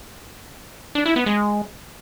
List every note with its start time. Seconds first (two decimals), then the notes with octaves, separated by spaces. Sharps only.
0.95 D4
1.06 E4
1.16 B3
1.26 G#3